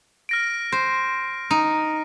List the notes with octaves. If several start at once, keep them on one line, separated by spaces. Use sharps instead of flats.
F6 A#6 D7
C5
D#4